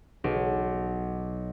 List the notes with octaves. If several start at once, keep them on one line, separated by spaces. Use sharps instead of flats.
B1